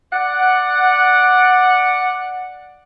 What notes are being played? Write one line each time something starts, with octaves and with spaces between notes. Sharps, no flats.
D5 F#5